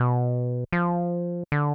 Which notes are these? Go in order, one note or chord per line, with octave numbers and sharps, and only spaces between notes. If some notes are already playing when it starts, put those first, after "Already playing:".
Already playing: B2
F3
D3